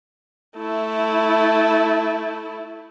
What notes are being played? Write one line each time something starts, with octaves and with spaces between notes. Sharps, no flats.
A3 E4